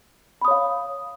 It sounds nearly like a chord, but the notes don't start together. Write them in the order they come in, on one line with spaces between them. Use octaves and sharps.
B5 D#6 C#5 F5